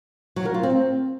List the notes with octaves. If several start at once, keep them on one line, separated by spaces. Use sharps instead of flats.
F#3
A#4
F4
C4